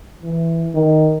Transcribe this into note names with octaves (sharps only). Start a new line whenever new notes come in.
E3
D#3